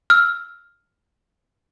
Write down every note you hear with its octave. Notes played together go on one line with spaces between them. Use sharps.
E6 F6